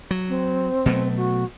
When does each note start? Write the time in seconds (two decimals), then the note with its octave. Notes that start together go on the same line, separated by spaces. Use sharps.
0.11 F#3
0.29 C4
0.86 B2 F#3 A3
1.17 F#4